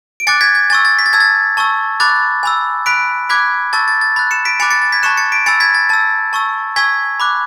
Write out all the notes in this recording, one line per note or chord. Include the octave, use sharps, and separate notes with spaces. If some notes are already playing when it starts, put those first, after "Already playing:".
D7
G#5 D6 F#6 A6 C#7
G#6 B6
G#6
G#5 C#6 E6 A6
A6
B6
A6
A5 E6 G#6
A6
A5 C#6 E6
B5 D6 F#6 A6
G#5 B5 E6
B5 F#6 B6 D7
B5 D6 F#6 G#6 B6
A5 C#6 E6 A6
A6
A6
B5 F#6 A6
C#7 E7
B6 D7
G#5 B5 D6 F#6 A6 C#7
A6 C#7
A6
G#6 B6
A5 C#6 F#6 C#7 E7
A6 C#7
B6 D7
G#5 B5 E6 A6 C#7
G#6 B6
A6
A5 E6 A6
A5 C#6 E6
G#5 C#6 E6 G#6 B6
B5 D6 F#6